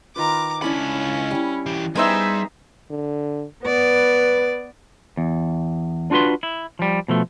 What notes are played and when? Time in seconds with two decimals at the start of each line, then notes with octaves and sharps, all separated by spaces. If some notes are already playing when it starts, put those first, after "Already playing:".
0.16 D#3 F4 B4 A#5 D6
0.62 C#2 C#4 D4 E4 A4 B5
1.31 G3 E4
1.66 E3 G4
1.96 G3 B3 D#4 G#4 C5 D#5 E5 G5
2.91 D3
3.64 B3 B4 D5
5.17 E2
6.11 D4 F4 F#4 B4 C6
6.43 E4
6.79 F3 G3
7.08 B2 F3 A3